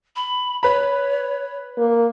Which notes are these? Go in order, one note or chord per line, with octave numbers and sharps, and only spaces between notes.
B5
B4 C#5 B5
A#3